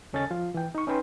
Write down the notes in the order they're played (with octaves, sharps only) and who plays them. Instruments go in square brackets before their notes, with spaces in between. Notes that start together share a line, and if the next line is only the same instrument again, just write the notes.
[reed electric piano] D#2 C#3 C#4 A4 D#5 A6
F3 F4
E3 G5
D#4 C#6
C#4 D#4 B4 G5 C6